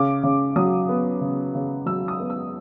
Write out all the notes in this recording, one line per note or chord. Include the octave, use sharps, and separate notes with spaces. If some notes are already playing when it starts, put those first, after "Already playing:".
Already playing: C#3 D6
C#3
F#3 D#6
B3
C#3
C#3
F#3 E6
D#6
B3
E6